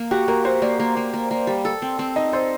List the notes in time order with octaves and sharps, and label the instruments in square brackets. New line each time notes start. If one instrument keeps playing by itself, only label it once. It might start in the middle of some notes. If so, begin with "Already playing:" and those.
Already playing: [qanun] A#3
[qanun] F#4 [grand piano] G4
[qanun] A#3 [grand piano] A#4
[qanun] F#4 [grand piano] C5
[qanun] A#3 [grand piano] D5
[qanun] A#3
A#3
A#3
A#3
G3
A4
C4
C4
[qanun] D#4 [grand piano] D#5
[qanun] A4 [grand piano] C5